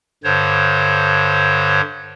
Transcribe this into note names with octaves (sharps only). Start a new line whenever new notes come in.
G2 D3 C5 C#5